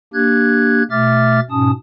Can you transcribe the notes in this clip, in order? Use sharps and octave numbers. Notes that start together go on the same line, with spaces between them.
A#3 D4 G4 F#6 G#6
B2 A3 E5 D6 F6 A6
G#2 B2 C#4 A5 D#6